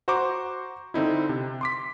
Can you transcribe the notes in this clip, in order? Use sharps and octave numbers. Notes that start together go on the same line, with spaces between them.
F#4 C5 A#5 C#6 D6
D3 C4 D#4 E4
C3
C6 D6 B6